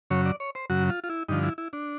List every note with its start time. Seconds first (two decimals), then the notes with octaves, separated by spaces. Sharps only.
0.10 F#2 C#3 F#3 C#5
0.26 D5
0.40 C#5
0.55 C5
0.70 F#2 C#3 F#3 F#4
0.89 F4
1.04 F4
1.10 E4
1.28 G2 D3 F3 D#4
1.43 E4
1.58 E4
1.73 D4